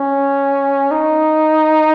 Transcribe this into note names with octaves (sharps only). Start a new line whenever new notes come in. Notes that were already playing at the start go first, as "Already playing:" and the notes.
Already playing: C#4
D#4